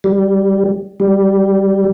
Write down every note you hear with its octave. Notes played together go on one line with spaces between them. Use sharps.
G3
G3